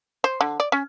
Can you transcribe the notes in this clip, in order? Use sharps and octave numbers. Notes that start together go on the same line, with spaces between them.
C5
D3
D5
C#4